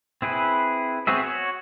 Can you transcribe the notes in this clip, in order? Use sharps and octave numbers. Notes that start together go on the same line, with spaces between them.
C4 E4 G#4 B4
B3 C4 F#4 G#4 E5
F#4 C#5